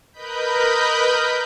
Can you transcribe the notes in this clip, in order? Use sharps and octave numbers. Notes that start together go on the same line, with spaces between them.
A#4 B4 D#5 B5 G6